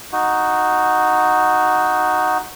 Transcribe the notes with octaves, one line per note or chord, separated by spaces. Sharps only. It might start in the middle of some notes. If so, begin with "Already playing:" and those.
D#4 F#4